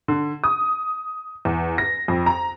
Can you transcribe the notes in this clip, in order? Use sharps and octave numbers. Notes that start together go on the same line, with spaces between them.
D3
D#6
E2
A#6
F2
A#5